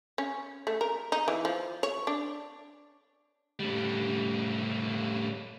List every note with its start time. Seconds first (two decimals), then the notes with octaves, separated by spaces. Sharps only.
0.18 C#4
0.67 A3
0.81 A#4
1.12 D#4
1.28 E3
1.45 F3
1.83 C#5
2.07 D4
3.60 A2 G3